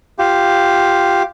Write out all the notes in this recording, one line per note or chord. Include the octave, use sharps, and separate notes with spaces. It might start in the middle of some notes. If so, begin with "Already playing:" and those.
F4 G4